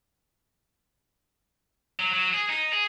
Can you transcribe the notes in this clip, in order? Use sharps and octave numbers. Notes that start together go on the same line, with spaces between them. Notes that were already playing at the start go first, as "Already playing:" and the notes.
F#3
F#3
G#4
D#4
G#4